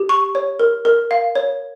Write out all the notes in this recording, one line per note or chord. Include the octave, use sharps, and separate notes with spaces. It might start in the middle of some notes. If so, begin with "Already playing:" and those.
Already playing: G4
C#6
C#5
A#4
A#4
F5
C#5